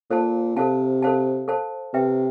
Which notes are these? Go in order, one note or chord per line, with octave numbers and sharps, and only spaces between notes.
A#2 A4 C5 F5 A5
C3 A4 C5 F5 A5
A4 C5 F5 A5
A4 C5 F5 A5
C3 B4 E5 G5